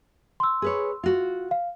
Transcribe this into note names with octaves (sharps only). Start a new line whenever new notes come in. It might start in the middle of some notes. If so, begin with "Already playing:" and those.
C6 E6
G#4 B4 C#5
F4 F#4
F5